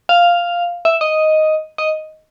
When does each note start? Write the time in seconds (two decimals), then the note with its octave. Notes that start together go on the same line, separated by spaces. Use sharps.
0.09 F5
0.85 E5
1.01 D#5
1.78 D#5